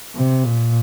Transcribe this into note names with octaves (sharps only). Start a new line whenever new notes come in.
C3
A#2